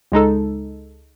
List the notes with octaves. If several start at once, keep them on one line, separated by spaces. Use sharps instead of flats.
C#2 G#3 D#4 A4